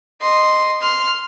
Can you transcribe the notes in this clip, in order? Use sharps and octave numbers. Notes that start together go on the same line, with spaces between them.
D#5 C6
C6 F6